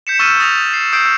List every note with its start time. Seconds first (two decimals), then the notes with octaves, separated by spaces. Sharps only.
0.07 G6 B6 C#7 E7
0.19 C#6 E6 F6 A6 B6 D#7
0.40 D#6 A6 A#6 F7
0.73 C7
0.93 D#6 E6 G6 C7 D7